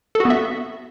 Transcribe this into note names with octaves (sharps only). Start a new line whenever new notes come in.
A4
F#4
B3
E5